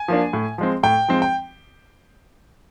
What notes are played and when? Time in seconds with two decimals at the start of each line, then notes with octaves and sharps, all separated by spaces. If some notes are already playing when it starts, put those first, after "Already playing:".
Already playing: G#5
0.08 F3 A#3 D4
0.33 A2
0.58 F3 G#3 C4
0.83 A2 G5
1.08 F3 G#3 C4
1.22 G5